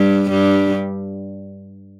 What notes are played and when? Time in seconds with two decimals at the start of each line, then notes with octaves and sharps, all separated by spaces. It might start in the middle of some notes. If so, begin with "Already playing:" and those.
Already playing: G2 G3
0.30 G2 G3